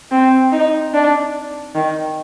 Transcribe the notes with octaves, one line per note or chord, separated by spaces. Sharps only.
C4
D#4
D4
D#3